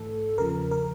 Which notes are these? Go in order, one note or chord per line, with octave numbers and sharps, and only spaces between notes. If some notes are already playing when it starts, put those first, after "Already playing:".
Already playing: G#2 E3 A3 A4
E2 C#3 F3 A#4
A#4